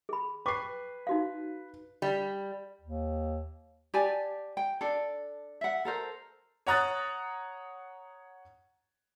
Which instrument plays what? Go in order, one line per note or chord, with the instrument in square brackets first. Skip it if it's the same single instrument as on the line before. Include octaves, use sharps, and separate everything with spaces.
[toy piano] G#4 B5
[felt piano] B4 C7 [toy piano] G5 C#6 D6
[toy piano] D#4 F#4 F5
[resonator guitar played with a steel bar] G3
[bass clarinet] D#2
[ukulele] G4 D5 G#5 A5
G5
D4 A4
E5 F#5
A4 A#4 C5
[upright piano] C#5 F#5 A#5 D#6 F#6 A6